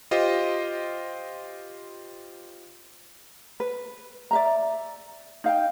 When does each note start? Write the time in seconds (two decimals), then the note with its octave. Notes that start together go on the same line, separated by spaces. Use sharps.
0.11 F4 G4 C5 D#5
3.60 B4
4.31 D5 E5 A#5
5.44 D#4 F5 G5